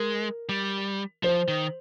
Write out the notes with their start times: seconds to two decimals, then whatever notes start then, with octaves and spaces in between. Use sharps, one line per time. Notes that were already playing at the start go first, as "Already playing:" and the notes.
Already playing: G#3 A#4
0.49 G3
1.23 F3 C5
1.48 D#3